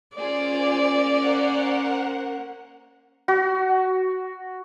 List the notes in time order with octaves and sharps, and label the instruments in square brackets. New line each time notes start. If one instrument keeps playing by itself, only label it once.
[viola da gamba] A#3 C#4 [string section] F4 G#4 C5 [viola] D5
[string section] A#4 C5 F#5
[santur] F#4